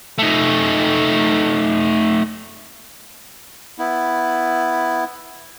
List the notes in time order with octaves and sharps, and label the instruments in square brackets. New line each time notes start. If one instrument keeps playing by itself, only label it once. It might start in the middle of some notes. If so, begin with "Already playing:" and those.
[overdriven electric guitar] A3 D#4
[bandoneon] B3 E4